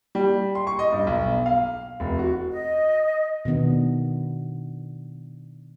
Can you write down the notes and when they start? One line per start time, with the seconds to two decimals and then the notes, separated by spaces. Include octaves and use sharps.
0.15 G3
0.55 C6
0.67 C#6
0.79 D#5
0.92 G2
1.07 B1
1.46 F5
2.00 F1
2.19 F#4
2.51 D#5
3.45 B2 D#3 B3 D4